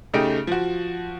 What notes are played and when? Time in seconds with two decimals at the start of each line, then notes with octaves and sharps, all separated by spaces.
0.14 C#3 A3 D#4 G4 D7
0.47 F3 F#4